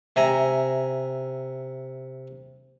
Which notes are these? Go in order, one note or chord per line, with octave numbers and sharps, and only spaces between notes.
C3 E5 G#5 A#5